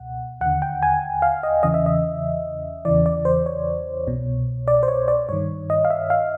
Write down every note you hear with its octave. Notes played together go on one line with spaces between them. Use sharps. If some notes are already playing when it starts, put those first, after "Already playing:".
Already playing: C#2 B2 F#5
D#2 D3 F#5
G5
G#5
F5
D#5
E2 C#3 E3 D#5
E5
D#5
E2 C#3 E3 D5
D5
C5
C#5
C2 B2
D5
C5
C#5
D5
G2 D#3 C#5
D#5
F5
E5
F5